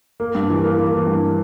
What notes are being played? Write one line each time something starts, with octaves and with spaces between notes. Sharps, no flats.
A#3
G2
E3
A#3
A#3
E3
G2